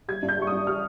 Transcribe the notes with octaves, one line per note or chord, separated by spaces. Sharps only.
G3 G#6
G2
G6
G3 C#6
G2 D#6
G3 F6